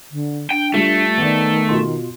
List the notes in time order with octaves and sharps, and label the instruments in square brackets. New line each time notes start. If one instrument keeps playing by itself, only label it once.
[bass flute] D3
[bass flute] D4 [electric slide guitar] G5
[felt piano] G3 F4 [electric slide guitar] A3
[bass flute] D#3 [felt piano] B3 D5
[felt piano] B2 F4 C6